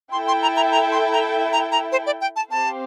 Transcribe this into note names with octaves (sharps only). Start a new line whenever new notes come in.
E4 A4 E5 G5 C6
C6
A#5
A#5
A#5
C6
A#5
A#5
A#5
C5
D5
G5
A5
C4 G4 C5 F5 A5